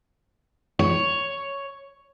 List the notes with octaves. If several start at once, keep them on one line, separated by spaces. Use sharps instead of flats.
C#5